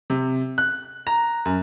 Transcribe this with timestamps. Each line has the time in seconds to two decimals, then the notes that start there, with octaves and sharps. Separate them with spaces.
0.10 C3
0.58 F#6
1.07 A#5
1.45 F#2